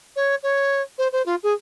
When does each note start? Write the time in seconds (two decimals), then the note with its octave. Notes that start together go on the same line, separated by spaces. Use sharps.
0.16 C#5
0.43 C#5
0.98 C5
1.13 C5
1.26 F4
1.43 G#4